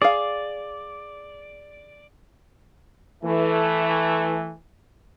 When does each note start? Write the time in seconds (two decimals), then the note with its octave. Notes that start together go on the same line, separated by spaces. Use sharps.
0.02 G#4 D5 F5
3.24 E3 A3